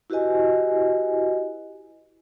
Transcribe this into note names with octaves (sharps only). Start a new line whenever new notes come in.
E4 F#4 G4 B4 D#5 G#5